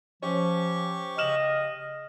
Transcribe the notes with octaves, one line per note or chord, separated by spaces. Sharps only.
F3 C#4 G4 C#6
C#3 D#5 F6 E7 F#7